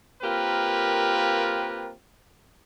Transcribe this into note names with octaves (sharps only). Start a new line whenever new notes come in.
A#3 C4 F4 G4 A#4 B4